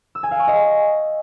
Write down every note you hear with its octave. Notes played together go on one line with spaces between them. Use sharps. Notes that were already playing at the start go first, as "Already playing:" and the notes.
E6
G#5
F5
C#6
D#5